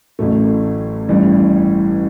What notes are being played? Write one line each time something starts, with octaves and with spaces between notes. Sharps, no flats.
A1 A2 F#3 A3
A1 G2 E3 G3